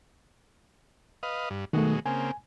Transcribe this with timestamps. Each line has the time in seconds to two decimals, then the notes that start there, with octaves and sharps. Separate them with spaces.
1.23 B4 D#5 F5
1.50 G2
1.73 B2 D#3 F#3 G#3 A3
2.06 C#3 A#3 C4 G#5